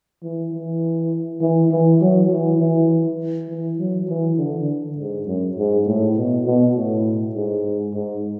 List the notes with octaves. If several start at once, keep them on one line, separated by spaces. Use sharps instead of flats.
E3
E3
E3
E3
F#3
E3
E3
E3
F#3
E3
D3
D3
G#2
F#2
G#2
A2
B2
B2
A2
G#2
G#2